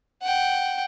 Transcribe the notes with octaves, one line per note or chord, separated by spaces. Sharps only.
F#5 G5